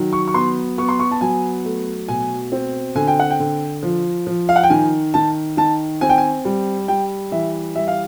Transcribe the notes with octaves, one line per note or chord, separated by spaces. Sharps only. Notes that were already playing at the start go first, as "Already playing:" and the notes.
Already playing: D#3 F#3
C#6
C#6
B3 C6
B3 C#6
C6
C#6
A5
F#3 G#5
A3
B2 G#5
C4
D3 G#5
G5
F#5
G5
D3
F3
F3
F5
F#5
G5
D#3 G#5
D#3 A5
D#3 A5
C4 G#5
G5
G#5
G3
G3 G5
E3 E5
G3 E5
F5